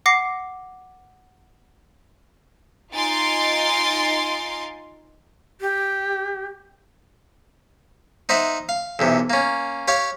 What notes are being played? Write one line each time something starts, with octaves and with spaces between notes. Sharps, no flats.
F#5 D6 A#6 C7
D#4 F4 G#5 C6 A6 D7
G4
D#4 C5 E5 F#5
F5
B1 E2 C3
A#3 C#4
G4 C#5 F5